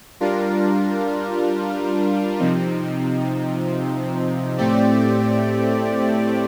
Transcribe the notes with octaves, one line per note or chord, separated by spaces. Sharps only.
G3 D4 F4 A#4
C3 F3 C4 D#4
A2 A3 C4 G4 D5